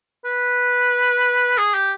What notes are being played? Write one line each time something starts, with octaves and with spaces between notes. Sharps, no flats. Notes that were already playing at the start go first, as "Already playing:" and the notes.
B4
G#4
G4